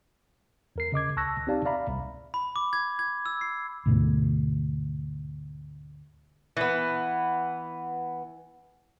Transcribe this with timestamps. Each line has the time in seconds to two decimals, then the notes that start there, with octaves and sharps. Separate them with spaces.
0.76 E2 A#4 C7
0.92 C#3 D#5 D6 G#6
1.17 C#2 A5 C#6 E6 F#6 A#6
1.47 C4 D#4 G4 D5 F5 A5
1.65 D5 E5 F5 A#5 B5
1.88 C2
2.34 B5
2.56 D6
2.73 G#6
2.99 G#6
3.26 E6
3.41 C7
3.86 D2 G#2 B2 A3
6.57 E3 B3